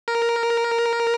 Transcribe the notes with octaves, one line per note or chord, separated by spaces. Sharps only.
A#4